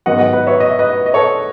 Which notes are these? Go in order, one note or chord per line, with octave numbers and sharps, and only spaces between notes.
G#2 D#3 F#3 B3 D#5 F#5
D#5 F#5
B4 D#5
C#5 E5
D#5
E5
B4 D#5
D#5
A4 C#5